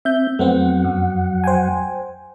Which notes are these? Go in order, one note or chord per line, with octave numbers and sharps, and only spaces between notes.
C4 E5 G6
F2 F#3 A3 B3 C4 F#5
F#2
C5 G5 G#5